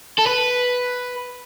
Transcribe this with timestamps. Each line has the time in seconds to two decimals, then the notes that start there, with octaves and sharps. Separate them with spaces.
0.18 A4
0.26 B4